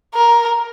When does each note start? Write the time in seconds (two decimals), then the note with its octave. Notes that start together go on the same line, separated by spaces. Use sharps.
0.15 A#4